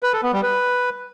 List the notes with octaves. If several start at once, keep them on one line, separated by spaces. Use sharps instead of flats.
B4
A4
B3
G3
B4